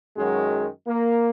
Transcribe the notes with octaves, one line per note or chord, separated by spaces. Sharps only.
F#2 D#3 F#3 G#3
A#3